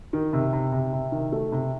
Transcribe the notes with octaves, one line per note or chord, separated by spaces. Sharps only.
D#3
C3
C3
C3
C3
D#3
A3
C3